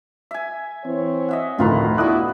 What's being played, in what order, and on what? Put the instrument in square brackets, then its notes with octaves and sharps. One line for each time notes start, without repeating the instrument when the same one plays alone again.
[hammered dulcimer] E5 G#5
[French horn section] E3 C4 C#5
[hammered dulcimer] D#5 E5 F#5
[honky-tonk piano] D2 A2 F3 [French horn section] D#3 A3 [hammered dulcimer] F4 B4 A#5
[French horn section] B3 D4 E4 [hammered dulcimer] F#4 D6 [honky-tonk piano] D#6 F#6